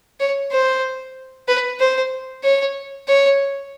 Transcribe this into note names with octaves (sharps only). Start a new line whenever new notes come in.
C#5
C5
B4
C5
C#5
C#5